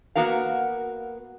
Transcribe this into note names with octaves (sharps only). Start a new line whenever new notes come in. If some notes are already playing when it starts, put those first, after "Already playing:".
A#3 B3 F#4 A#4 F5